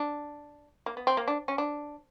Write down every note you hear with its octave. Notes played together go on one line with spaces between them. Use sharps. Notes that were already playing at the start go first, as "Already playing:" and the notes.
Already playing: D4
A#3
B3
C4
A#3
D4
C#4
D4